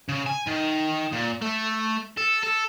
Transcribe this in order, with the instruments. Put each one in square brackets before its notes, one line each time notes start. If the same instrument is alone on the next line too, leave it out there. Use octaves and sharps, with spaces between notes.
[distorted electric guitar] C#3
G#5
D#3
A#2
A3
A4
A4